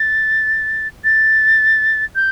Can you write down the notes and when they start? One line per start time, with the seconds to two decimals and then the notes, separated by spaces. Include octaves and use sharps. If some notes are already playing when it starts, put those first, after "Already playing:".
Already playing: A6
1.04 A6
2.15 G6